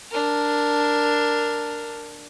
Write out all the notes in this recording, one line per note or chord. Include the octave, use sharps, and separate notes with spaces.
D4 A#4